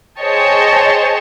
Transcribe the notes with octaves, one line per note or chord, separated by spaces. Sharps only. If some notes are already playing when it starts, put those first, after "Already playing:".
G#4 C5 C#5 D#5 G5 A5